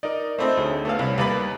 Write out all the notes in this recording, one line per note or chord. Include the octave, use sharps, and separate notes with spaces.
D#4 A#4 D5
A3 C4 D#4 C5 E5 B5
D2 G#4 C#5
A3 B3 F5
C2 C#5 F5
D#2 G3 B4 B5